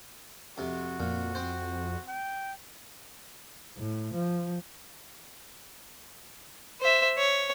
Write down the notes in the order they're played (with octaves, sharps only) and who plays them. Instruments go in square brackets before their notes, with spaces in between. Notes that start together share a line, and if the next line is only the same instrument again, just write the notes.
[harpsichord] F2 C3 [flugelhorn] F#4
[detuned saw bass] F2 [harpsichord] A#2
[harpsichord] C4 C5
[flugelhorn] G5
[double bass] A2
F3
[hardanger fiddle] C5 E5
C#5